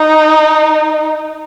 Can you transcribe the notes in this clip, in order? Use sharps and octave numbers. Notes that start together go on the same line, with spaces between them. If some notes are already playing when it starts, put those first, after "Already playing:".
Already playing: D#4